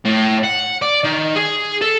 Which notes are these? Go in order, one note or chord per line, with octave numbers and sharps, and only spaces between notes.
A2
F#5
D5
D#3
G#4
A4